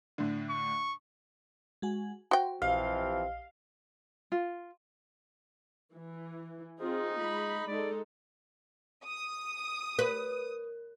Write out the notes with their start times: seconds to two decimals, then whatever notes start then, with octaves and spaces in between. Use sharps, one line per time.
0.18 A2 D3
0.50 C#6
1.82 G#3 F#4 G#5
2.31 F#4 C5 G5
2.62 A#1 E3 F3 C4 G4 D#5 F5
4.32 F4
5.95 E3
6.80 C4 D#4 F4 G#4
7.21 G#3 B5
7.67 G#3 D#4 A4 D5
9.05 D#6
9.99 A#4 B4